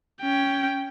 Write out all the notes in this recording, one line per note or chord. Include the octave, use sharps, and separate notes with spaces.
C#4 G5